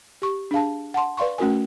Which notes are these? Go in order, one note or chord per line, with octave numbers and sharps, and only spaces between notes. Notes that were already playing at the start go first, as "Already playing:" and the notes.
G4 C#6
D4 G#4 F5 A5
F#5 A5 C6
B4 D5 F5 C6 C#6
A3 C#4 F#4 A#4 G#5